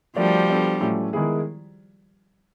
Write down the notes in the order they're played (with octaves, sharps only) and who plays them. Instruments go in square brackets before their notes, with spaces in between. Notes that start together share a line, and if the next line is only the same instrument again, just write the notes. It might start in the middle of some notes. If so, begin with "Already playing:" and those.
[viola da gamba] F3 G3 [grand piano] A3 D4 F#4 A#4 D5
[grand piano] B3 D4 F#4 A4
A2 F#3 A3 C#4
D#3 G#3 B3 E4 G#4